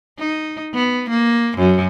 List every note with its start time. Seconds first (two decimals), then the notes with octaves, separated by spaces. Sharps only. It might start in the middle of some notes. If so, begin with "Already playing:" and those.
0.19 D#4
0.74 B3
1.10 A#3
1.58 F#2